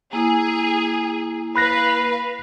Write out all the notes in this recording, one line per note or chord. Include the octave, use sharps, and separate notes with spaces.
A#3 E4 G#4
B4 F5 B5 F#6 A#6